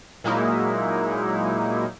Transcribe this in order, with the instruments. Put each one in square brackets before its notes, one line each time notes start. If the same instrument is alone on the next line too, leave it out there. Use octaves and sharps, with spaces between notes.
[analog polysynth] A#2 F#3 G#3 A#3 D#4 E4